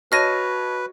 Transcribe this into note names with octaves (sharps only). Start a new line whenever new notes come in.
F#4 B4 C#5 D#5 A5 F6 A#6 D#7